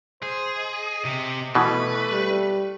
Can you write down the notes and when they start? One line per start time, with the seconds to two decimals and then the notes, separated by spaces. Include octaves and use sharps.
0.22 G#4 C5
0.58 D#5
1.05 C3
1.55 B2 E3 A3 B4
2.11 G3